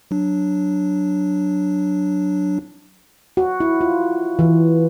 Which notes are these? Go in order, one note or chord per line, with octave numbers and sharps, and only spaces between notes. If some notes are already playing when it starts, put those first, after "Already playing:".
F#3 D4
F#4
E4
F4
E3